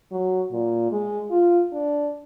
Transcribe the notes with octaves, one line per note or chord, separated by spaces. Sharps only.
F#3
A#2
G#3
F4
D4